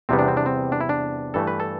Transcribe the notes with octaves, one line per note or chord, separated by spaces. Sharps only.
E2 C3 G3 B3 C4
D4
C4
D4
C4
D4
E4
D4
G2 E3 A3 A4
B4
A4